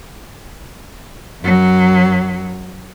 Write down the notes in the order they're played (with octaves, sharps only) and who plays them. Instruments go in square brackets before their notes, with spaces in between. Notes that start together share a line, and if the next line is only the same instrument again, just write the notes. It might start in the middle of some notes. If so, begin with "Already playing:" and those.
[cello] F#2 F#3